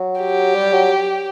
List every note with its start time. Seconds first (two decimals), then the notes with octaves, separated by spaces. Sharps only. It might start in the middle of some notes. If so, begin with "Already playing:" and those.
Already playing: F#3
0.20 G4
0.54 G3
0.72 F#3